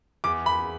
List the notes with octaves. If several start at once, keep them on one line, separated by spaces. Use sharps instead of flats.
E2 D6
B5